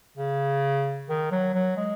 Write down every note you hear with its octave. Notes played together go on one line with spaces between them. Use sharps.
C#3
D#3
F#3
F#3
G#3